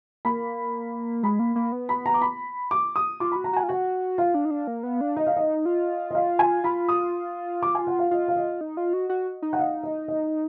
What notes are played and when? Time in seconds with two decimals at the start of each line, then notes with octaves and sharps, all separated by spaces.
0.25 A#3 B5
1.23 G#3 B5
1.39 A#3
1.56 A#3
1.72 B3
1.89 B5
2.06 A#5
2.14 D6
2.22 B5
2.71 D6
2.96 D#6
3.20 F4 D6
3.32 F#4 B5
3.44 A#5
3.53 F#4 G#5
3.63 F4
3.69 F#4 F#5
4.18 F4 F5
4.34 D4
4.45 D#4
4.51 D4
4.67 A#3
4.83 B3
5.01 D4
5.16 D#4 D#5
5.27 F5
5.36 D#5
5.66 F4
6.11 D#5
6.15 F5
6.39 G#5
6.64 F4 B5
6.89 D#6
7.63 D6
7.75 G#5
7.87 F#5
7.99 F5
8.11 F4 D#5
8.28 F5
8.36 D#5
8.61 D#4
8.77 F4
8.93 F#4
9.09 F#4
9.42 D#4
9.53 F#5
9.59 F5
9.83 D#5
10.08 D#5